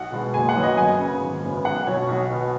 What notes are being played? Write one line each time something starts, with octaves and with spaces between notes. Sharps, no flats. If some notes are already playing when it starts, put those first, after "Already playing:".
Already playing: B1 F#5
B2 G#3 B3
F#1 G#5
F#5
F#2 F#3 B3
D#5
F#2 G#5
C#3 B3
G#1
F#2 C#3 B3
B1 F#5
B2 F#3 C#5
B1
B2 B3